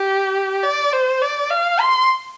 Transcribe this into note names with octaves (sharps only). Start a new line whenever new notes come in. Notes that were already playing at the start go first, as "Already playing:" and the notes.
Already playing: G4
D5
C5
D5
F5
C6